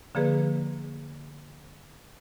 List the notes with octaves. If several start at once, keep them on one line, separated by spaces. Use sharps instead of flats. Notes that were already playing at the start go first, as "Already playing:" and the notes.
D3 F3 A#3 G#4 B4